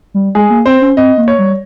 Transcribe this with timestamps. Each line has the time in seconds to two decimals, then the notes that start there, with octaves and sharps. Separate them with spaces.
0.14 G3
0.35 G#3 G#4
0.50 A#3
0.66 C4 C5
0.82 C#4
0.97 C4 D#5
1.17 A#3
1.28 C#5
1.39 G3